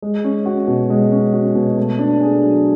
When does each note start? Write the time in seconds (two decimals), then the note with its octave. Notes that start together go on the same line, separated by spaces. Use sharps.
0.02 G#3
0.24 C#4
0.46 F#4
0.67 B2
0.90 G#3
1.12 C#4
1.33 F#4
1.55 B2
1.77 A3
1.99 D4
2.21 G#4
2.42 F#3